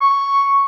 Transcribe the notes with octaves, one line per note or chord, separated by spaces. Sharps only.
C#6